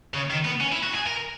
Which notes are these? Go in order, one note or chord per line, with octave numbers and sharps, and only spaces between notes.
C#3
D#3
B3
C#4
E4
F#4
G#4
A#4